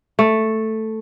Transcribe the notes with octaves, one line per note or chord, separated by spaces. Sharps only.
A3